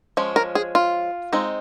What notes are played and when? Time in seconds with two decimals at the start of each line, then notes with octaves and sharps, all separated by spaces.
0.17 F3 G#3 C#4
0.36 A#4
0.55 G#4
0.75 F4
1.33 G#3 C4 D#4